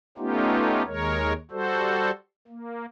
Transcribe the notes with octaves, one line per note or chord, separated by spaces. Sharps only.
A3 B3 C#4 D#4 F4 G4
D#2 G#3 A#4 C#5
G3 F#4 A4 C5
A#3